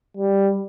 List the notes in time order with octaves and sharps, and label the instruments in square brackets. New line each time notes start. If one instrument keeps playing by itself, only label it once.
[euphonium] G3